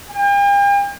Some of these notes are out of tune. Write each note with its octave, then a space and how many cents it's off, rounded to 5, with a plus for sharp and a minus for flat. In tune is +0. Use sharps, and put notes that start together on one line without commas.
G5 +45